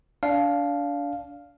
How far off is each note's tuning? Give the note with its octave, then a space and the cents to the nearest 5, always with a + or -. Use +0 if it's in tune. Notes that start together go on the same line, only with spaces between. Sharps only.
D4 -25 F5 +0